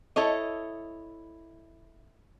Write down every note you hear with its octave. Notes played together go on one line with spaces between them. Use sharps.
E4 A4 C#5 D#5